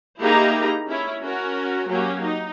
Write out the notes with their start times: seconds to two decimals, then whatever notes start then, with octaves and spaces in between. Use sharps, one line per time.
0.20 A#3 D#4 E4 G4 G#4 A#5
0.88 C#4 E4
1.23 C#4 F#4 A#4
1.87 F#3 A#3 C#4 G4
2.22 D#4